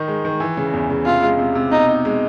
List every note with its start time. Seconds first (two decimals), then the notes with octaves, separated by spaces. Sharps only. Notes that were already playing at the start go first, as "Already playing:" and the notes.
Already playing: D#3 D#4
0.08 G#3
0.25 D#3
0.40 E3
0.57 C#3
0.73 E2
0.90 C#3
1.06 C3 F4
1.22 G#3
1.39 C3
1.55 C3
1.71 B2 D#4
1.89 D#4
2.05 G#3